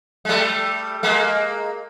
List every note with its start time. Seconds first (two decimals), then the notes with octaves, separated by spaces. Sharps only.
0.25 G#3
0.29 G3 A3
1.03 G#3 A#3